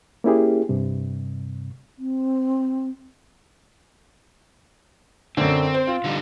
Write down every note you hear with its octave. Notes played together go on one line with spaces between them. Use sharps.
A#3 C#4 E4 G4 G#4
G2 C3
C4
F#2 D3 C4
C5
F4
D3 G3 D#4